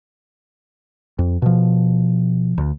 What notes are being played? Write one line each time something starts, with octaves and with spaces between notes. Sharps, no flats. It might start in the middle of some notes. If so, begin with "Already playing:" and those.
F2
B2 F3
D2